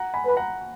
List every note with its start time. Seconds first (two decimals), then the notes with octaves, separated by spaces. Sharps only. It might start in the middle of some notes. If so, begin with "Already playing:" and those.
Already playing: F#5 A#5
0.14 G#5 B5
0.26 B4 B5
0.37 F#5 A#5